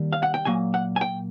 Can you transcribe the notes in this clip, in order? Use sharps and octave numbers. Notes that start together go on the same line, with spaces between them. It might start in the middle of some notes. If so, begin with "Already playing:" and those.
Already playing: D#2 D#3 G3 A#3
F5
F#5
G5
A#2 F#3 A#3 G#5
F#5
G#5
G5